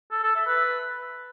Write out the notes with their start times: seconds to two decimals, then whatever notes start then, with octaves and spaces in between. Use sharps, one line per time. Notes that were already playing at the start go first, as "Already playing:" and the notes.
0.11 A4
0.23 A4
0.35 E5
0.47 B4